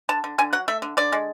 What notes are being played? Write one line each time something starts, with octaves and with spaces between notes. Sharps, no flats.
D3 A5
D3
D3 G#5
F#3 F#5
A3 E5
D3
D3 D5
G#3